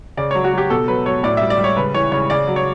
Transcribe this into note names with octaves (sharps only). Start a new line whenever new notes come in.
C#3 D5
F#3 C#5
F#4
F#3 G4
B2 A4
F#3 B4
F#3 C#5
A2 D5
G3 E5
D5
G3
C#5
C#3 B4
E3 C#5
C#3 C#5
C#3 D5
F#3
C#5